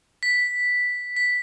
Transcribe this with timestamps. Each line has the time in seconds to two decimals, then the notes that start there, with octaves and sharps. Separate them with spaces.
0.23 B6
1.17 B6